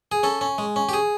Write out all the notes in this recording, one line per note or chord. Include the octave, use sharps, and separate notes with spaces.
G#4
C#4 A4
C#4
G#3
C#4
G4
G#4